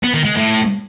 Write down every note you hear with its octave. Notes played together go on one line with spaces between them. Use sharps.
B3
D#3
G#3
A2